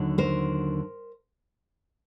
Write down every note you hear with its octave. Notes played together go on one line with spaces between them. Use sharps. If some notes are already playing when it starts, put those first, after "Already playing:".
Already playing: D#2 D3 F#3
A#4 C5